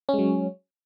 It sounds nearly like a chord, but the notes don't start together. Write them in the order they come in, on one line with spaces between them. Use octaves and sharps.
C#4 G#3 F#3